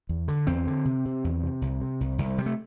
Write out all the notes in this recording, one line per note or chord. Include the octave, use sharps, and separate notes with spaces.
E2
D3
E2 C4
D3
C3
C3
E2
C3
C2
C3
C2
C2
C3 G3
A3